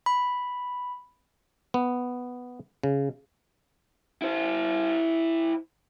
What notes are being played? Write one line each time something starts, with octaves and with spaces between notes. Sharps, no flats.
B5
B3
C#3
E4 C5